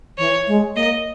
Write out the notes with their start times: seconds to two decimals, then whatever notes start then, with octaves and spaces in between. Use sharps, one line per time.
0.18 E3 C#5
0.47 G#3
0.75 A#3 D#5